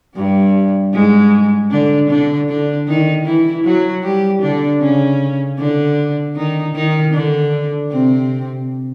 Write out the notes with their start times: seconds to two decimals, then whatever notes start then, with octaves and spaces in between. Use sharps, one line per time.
0.16 G2 G3
0.93 G#2 G#3
1.71 D3 D4
2.09 D3 D4
2.48 D3 D4
2.87 D#3 D#4
3.25 E3 E4
3.64 F#3 F#4
4.03 G3 G4
4.42 D3 D4
4.81 C#3 C#4
5.58 D3 D4
6.36 D#3 D#4
6.75 D#3 D#4
7.13 D3 D4
7.91 C3 C4